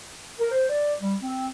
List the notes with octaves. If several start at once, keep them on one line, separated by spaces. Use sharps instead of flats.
A#4
C5
D5
G3
C4